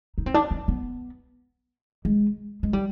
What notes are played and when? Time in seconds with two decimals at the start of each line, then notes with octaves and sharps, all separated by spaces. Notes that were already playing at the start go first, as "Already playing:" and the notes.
0.18 D#4
0.26 C4
0.34 D4
0.51 C4
0.68 B3
2.05 G#3
2.63 G#3
2.73 G3